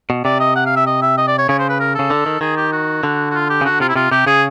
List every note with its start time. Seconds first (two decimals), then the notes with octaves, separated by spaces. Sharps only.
0.10 B2
0.25 C3 D5
0.40 D#5
0.56 F#5
0.66 F5
0.76 E5
0.87 D#5
1.02 E5
1.18 D#5
1.28 D5
1.38 C#5
1.49 C#3 C#5
1.59 C5
1.69 B4
1.80 A#4
1.95 C#3 A4
2.10 D3
2.26 D#3
2.41 D#3 G#4
2.57 G4
2.72 F#4
3.03 D3
3.30 F#4
3.34 F4
3.50 G4
3.61 C#3
3.65 D3 F#4
3.80 C3 F4
3.89 E4
3.95 C3 F4
4.11 C3 G4
4.26 C#3 G#4